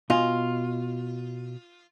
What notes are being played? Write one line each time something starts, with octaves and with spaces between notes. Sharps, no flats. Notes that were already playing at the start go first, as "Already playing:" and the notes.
B2 F4 D#5 G#5